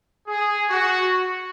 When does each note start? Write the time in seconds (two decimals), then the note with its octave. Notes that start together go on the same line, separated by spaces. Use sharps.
0.27 G#4
0.69 F#4